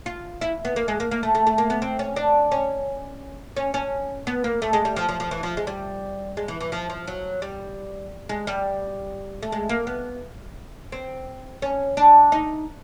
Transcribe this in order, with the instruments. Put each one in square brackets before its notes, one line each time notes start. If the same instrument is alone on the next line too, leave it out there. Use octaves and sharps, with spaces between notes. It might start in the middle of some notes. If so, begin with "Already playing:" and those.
[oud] F4
E4
B3
A#3
G#3
A#3
A#3
A3
A3
A3
A#3
B3
C4
C#4
D4
C#4
C#4
C#4
B3
A#3
A3
G#3
G3
F3
F3
F3
E3
F3
G#3
G3
G#3
E3
E3
F3
F3
F#3
G3
G#3
G3
A3
G#3
A#3
B3
C4
C#4
D4
D#4